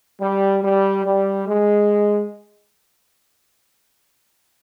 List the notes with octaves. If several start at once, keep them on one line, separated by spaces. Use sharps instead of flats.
G3
G3
G3
G#3